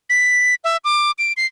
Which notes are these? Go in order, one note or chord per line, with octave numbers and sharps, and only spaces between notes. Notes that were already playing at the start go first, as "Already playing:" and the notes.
B6
E5
D6
D7
C7